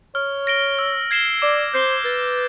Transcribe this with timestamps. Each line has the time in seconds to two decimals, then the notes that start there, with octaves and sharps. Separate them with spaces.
0.15 C#5 F6
0.47 A#6 D7 G7
0.79 E6
1.11 G#6 C7 E7 G7
1.42 D5 D6
1.74 C5 G6 C7 E7 G7
2.05 B4 A6